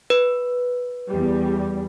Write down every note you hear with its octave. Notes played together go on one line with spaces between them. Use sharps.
B4
E2 G3